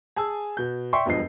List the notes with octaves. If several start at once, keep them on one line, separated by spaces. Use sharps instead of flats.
G#4 G#5 A5 E6
B2 G6
D5 E5 G5 C6 C#6
E1 G2 F3 D#5 C7